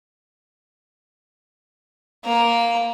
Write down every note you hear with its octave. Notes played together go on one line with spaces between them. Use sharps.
A#3 A#5